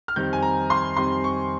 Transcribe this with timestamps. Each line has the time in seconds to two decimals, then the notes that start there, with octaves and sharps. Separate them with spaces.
0.08 F6
0.16 F2 D#3 G3 C4 G6
0.33 G#5
0.42 A#5
0.70 C6
0.96 F2 D#3 G3 C4 C6
1.24 C#6